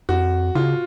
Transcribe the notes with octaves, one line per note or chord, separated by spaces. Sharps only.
F2 F#4
C#3 F4